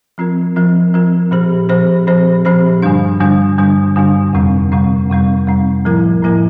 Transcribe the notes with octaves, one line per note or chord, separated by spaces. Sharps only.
F3 C4 F4 A#4
F3 C4 F4 A#4
F3 C4 F4 A#4
A#2 F3 C4 G4 C5
A#2 F3 C4 G4 C5
A#2 F3 C4 G4 C5
A#2 F3 C4 G4 C5
G2 D3 G3 D4
G2 D3 G3 D4
G2 D3 G3 D4
G2 D3 G3 D4
F2 C3 G3 C4
F2 C3 G3 C4
F2 C3 G3 C4
F2 C3 G3 C4
A2 F3 A#3 E4 A#4
A2 F3 A#3 E4 A#4